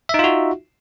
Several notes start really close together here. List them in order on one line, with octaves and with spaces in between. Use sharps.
E5 D#4 F4 F#4